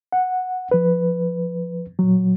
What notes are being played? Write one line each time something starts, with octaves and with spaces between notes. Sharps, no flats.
F#5
F3 B4
A#2 F#3